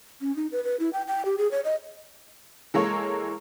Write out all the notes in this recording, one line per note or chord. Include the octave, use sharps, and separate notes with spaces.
C#4
D#4
B4
B4
E4
G5
G5
G4
G#4
C#5
D#5
E3 G#3 A#3 A4 C#5